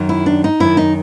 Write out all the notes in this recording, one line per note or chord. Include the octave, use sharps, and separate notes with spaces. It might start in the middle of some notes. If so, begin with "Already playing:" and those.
Already playing: F#2 D#3
E4
D4
D#4
F#2 D#3 E4
D#4